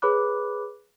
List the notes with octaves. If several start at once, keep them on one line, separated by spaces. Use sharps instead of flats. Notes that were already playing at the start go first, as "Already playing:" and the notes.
G#4 B4 C#5 B5 D6 F#6